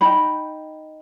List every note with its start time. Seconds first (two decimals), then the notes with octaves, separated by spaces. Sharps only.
0.01 D#4 G5 B5